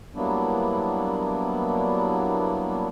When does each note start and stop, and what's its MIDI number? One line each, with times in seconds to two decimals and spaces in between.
0.15 2.88 54
0.15 2.88 55
0.15 2.88 58
0.15 2.88 59
0.15 2.88 62
0.15 2.88 64